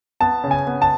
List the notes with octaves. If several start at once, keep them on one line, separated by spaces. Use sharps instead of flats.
B3 A5
C#3
G#5
B3
A5